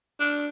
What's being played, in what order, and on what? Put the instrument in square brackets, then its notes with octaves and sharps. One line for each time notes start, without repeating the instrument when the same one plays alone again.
[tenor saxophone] D4